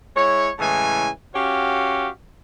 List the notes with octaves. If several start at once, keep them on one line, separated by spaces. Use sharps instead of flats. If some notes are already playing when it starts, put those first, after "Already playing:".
G#3 E4 C#5
A2 C#3 E3 G#3 G#5
C#4 F#4 G4 C#5 F5